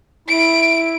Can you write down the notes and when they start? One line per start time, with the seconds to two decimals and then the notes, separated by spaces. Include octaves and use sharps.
0.28 E4 D7